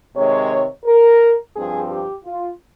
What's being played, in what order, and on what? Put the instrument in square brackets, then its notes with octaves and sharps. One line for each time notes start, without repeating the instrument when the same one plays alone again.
[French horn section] C3 D#3 G#3 C#5
A#4
G2 F3 C4 G#4
G4
F4